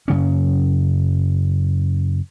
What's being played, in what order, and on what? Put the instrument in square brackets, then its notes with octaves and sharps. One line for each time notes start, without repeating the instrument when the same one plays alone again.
[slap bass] F#2 C#3 C#4